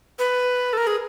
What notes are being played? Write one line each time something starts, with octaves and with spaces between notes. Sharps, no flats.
B4
A4
A#4
G#4